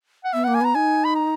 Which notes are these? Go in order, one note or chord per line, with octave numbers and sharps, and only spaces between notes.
F#5
B3 E5
A#3 F#5
G#5
B3 A#5
D#4 G#5
B5
A#5